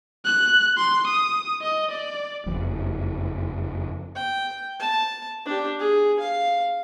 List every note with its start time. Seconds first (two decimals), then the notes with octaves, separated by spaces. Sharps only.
0.25 F#6
0.77 C6
1.07 D#6
1.61 D#5
1.91 D5
2.46 F#1 F2
4.16 G5
4.80 A5
5.46 D4 G4
5.79 G#4
6.20 F5